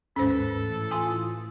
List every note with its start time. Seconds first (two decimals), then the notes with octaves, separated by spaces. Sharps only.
0.16 D#2 G#2 C#4 A4 B4 C5
0.57 A2 E3
0.91 F4 G#5 C6 D#6